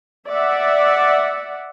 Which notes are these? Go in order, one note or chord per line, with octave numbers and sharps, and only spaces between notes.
D5 E5 F#5